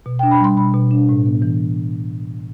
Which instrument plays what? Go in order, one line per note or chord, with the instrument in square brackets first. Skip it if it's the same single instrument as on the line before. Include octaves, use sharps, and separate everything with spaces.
[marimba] B2
D4 G5
B5
G3 C6
B2 B5
B2
D4
A2
B3
E3